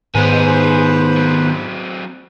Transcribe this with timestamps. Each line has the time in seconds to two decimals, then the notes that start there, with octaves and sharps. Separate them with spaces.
0.15 G#2 D#3 B3 G#4 B4 C5
1.17 F#3 C4